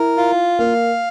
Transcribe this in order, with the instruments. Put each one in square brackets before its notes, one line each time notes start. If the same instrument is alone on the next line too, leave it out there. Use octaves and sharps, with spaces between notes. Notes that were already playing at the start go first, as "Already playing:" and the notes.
Already playing: [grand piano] E4 [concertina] A#4
[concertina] F4
[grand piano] A#3 [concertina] F5